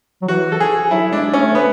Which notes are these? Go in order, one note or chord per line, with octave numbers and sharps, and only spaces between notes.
F#3
E3 F#4
A4
G#4
F#3 E4
G#3 D4
A3 C#4
B3